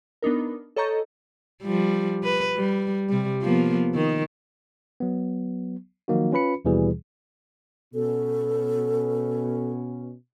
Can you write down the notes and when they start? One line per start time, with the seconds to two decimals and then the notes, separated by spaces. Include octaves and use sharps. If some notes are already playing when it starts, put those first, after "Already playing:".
0.22 B3 D4 D#4 A#4
0.76 A4 C#5 D#5 A#5 C#6 G6
1.63 F3 G3
2.24 B4
2.56 G3
3.09 C3 G3
3.42 F3 A#3 B3
3.95 D#3
5.00 F#3 B3
6.08 D#3 F3 F#3 A#3 D#4 F#4
6.32 C#4 F4 B4 B5 C#7
6.65 D#2 B2 E3 G3 G#4
7.94 B2 C#4 A4